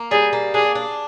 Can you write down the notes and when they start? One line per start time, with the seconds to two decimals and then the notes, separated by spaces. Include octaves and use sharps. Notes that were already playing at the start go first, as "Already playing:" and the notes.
Already playing: A#3
0.11 G3 G#4
0.33 A#3
0.54 D4 G#4
0.75 D4